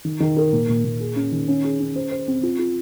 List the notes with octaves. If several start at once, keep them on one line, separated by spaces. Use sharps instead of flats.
D#3
D#3
A#4
A#2
A#2
A#2
G#4
C#4
D#3
C#4
G#4
C#4
C5
C5
C4
F4
F4